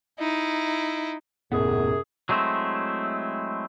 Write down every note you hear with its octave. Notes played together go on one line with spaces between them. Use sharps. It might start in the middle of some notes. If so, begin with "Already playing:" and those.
D#4 E4
D#1 F#2 A2 C3 B3 G#4
F#3 G#3 A3 C4 E4